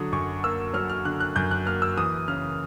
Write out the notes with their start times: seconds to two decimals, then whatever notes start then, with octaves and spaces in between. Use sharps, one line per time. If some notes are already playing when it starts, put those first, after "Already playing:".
Already playing: D3 F#3 D#6
0.12 F#2 C#6
0.44 A#3 E6
0.74 F#3 F6
0.89 F6
1.05 D3 F#6
1.20 F#6
1.36 F#2 G6
1.51 F#6
1.66 A#3 F6
1.82 E6
1.97 E3 D#6
2.28 C#3 F6